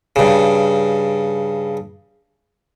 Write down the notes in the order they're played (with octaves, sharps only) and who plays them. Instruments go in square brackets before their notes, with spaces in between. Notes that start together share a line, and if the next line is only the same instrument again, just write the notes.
[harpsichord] G2 C#3